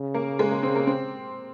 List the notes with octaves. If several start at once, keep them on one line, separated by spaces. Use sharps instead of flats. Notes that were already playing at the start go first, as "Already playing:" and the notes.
Already playing: C#3
A#3
G#3
A#3
C4
A#3
C4